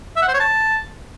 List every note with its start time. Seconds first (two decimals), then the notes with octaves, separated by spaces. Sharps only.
0.16 E5
0.22 F#5
0.28 C5
0.34 C#5
0.40 A5